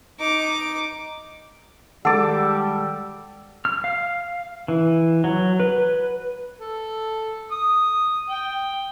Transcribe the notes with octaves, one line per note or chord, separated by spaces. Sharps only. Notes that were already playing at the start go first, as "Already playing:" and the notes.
D#4 D6
D#3 G3 G#3 A4 F#5 D6 A6
F6
F5
E3
F#3
B4
A4
D#6
G5